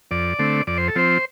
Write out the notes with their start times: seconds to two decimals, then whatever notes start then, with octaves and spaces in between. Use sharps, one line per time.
0.11 F2 D5
0.39 D3 A3 C4
0.67 F2 D5
0.77 C5
0.88 A4
0.96 F3 C4 C5